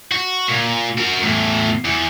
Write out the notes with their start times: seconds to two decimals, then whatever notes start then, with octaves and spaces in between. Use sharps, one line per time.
0.12 F#4
0.48 A#2
0.98 F#4 A#4
1.23 E2 A2
1.85 E2